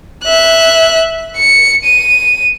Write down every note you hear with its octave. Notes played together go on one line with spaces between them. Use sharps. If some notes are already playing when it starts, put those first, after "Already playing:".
E5 F#6
C#7
D#7